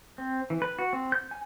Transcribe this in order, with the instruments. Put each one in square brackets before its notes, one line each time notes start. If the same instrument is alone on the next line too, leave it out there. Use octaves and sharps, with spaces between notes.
[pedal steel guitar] C4
E3
B4
F#4
C4
G6
G#5